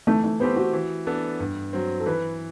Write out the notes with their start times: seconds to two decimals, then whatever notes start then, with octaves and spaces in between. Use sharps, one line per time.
0.07 E3 A3
0.24 A3
0.40 A3 B3 C4 G4 C5
0.56 F#4
0.73 E3
1.07 B3 D4 A4
1.40 G2
1.73 F#3 C4
2.00 A4
2.06 E3 B4